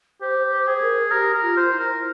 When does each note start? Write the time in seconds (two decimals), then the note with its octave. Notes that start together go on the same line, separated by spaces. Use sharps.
0.22 G4 C5
0.52 C5
0.67 G#4
0.82 A#4
1.11 G4 A#4
1.34 A#4
1.42 F4
1.57 C5
1.72 E4
1.79 A#4